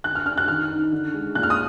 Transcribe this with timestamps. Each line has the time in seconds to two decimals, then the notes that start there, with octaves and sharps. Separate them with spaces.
0.04 D3 F#6
0.15 F6
0.26 D4 F6
0.38 F#6
0.48 D#3 F6
0.70 D#4
0.92 D3
1.14 G#3
1.35 A#2 F#6
1.43 F6
1.50 D#6